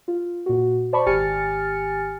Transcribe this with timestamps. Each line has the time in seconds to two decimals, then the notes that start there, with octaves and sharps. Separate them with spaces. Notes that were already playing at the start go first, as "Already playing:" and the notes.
0.08 F4
0.46 A#2 F#4
0.93 C5 D5 A5 B5 C#6
1.06 G#1 G4 G#5 F6 A6 C#7